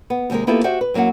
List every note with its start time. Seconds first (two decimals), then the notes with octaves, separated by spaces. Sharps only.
0.10 B3
0.30 D#2 C3 F3 G#3 A#4
0.47 A#3 B3 E4 F4 G4 A4
0.64 F#4 G4 C5 E5
0.81 B4
0.94 F#2 F#3 A#3 E4 F#5